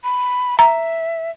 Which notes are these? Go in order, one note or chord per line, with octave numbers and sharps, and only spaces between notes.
B5
E5 A#5